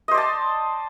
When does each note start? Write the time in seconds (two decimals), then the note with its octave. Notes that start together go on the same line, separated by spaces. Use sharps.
0.08 D#5
0.11 C5
0.14 D5
0.17 A5